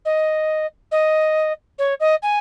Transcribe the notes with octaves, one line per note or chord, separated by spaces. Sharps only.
D#5
D#5
C#5
D#5
G#5